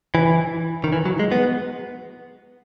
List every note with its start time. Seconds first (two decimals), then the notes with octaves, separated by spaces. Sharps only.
0.15 E3
0.84 D#3
0.93 E3
1.05 F#3
1.19 G#3
1.32 B3